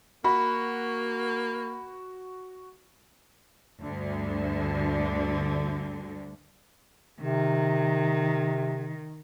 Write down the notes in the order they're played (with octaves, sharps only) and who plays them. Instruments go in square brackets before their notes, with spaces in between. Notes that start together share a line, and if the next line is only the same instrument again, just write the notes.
[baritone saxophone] A#3 [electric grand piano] F#4 [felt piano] B5
[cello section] D2 G2 D3
[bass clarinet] C3 [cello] D#3